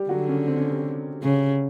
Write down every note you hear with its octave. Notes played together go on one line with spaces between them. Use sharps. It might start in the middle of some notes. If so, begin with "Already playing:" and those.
Already playing: G3 G4
D3 F#3 F#4
C#3 C#4
C4
C#4
C3 C4
C#3